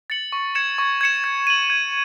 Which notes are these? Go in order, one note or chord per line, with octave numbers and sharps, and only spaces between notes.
A6 C#7 F#7
C#6
G#6 C#7 E7
C#6
G#6 C#7 E7
G#6
D#7 F#7
G#6